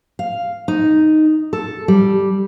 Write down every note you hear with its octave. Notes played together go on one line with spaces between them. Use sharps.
F5
D#4
A4
G3